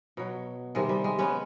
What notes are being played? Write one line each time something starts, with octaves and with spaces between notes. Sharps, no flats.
B2 F#3
C3 D#3 G3 G#3
G3
G#3
B3 C#4